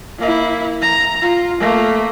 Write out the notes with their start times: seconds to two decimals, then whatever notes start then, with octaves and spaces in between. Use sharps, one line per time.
0.19 A#3 E4
0.82 A#5
1.22 F4
1.60 A3 A#3